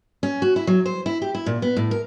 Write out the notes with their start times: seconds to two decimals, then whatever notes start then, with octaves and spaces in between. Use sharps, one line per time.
0.23 C#4
0.42 F#4
0.56 E4
0.67 F#3
0.86 C5
1.06 E4
1.22 G4
1.35 E4
1.46 A#2
1.62 B3
1.76 A2
1.91 A#4